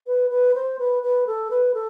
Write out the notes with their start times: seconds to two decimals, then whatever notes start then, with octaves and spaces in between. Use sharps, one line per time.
0.07 B4
0.30 B4
0.55 C5
0.79 B4
1.03 B4
1.27 A4
1.51 B4
1.74 A4